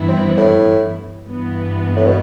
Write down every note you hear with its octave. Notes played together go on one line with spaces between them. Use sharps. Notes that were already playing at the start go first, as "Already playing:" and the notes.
Already playing: G2 E3 B3 E4
C4
A2
G2 E3 B3
A2
B2